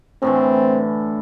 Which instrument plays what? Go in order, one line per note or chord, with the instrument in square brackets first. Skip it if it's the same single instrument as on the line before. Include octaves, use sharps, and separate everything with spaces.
[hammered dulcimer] A2 D3 E3 [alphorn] C4